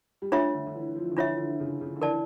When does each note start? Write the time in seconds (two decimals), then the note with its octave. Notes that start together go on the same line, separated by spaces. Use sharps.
0.22 G3
0.32 A3 D4 F4 C#5 E5
0.54 D3
0.67 D3
0.75 E3
0.96 F3
1.11 D3
1.17 E3 D4 F4 C#5 E5
1.38 D3
1.60 C#3
1.81 C#3
1.96 D3
2.02 E3 A#4 D5 A5